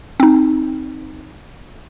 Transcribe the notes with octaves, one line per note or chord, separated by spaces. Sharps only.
C4 D#4